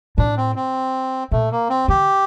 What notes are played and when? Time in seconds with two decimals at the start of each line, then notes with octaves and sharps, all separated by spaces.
0.18 A2 D4
0.37 C4
0.56 C4
1.31 A#2 A3
1.51 A#3
1.69 C4
1.88 D3 G4